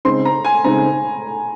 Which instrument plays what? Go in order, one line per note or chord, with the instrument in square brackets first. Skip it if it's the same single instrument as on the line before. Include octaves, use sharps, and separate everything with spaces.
[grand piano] C#3 G#3 C4 D#4 [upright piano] C6
[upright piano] A#5
G#5
[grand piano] C#3 G#3 C4 D#4 [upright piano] A#5